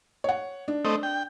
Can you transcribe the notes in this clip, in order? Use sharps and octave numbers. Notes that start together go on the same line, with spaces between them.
C#5 F#5
D4
A3 C4 D#5
G5